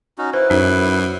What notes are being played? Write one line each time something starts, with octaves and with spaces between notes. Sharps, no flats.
C#4 D#4 F#4
E4 B4 C5
F#2 D#4